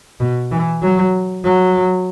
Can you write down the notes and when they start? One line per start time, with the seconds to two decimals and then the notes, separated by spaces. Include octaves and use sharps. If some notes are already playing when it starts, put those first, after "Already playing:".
0.20 B2
0.51 E3
0.82 F#3
1.44 F#3